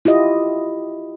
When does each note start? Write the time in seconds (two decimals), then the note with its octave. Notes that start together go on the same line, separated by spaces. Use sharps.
0.05 E4 F4 G4 D#5